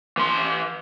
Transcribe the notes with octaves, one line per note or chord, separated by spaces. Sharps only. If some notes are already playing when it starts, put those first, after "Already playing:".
E3 C6